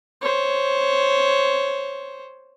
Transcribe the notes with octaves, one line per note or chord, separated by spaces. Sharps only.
C5 C#5